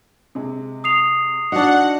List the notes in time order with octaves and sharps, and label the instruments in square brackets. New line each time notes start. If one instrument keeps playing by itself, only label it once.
[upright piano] C3 G#3
[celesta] D#6 C7 F7
[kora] D4 F#4 [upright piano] D#4 [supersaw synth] F#5